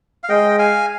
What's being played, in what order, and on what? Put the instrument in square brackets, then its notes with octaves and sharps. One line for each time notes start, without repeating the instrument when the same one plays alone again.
[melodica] F5
[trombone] G#3 [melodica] D#5 G5
[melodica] F5 G#5